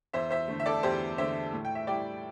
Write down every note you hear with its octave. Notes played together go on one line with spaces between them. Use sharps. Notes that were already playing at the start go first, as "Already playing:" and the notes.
E2 C5 E5
C5 E5
D3 A3
E5
A4 D5
E2 G4 C5
D3 A3 C5 E5
A2
G5
E5
G3 E4 D5 G5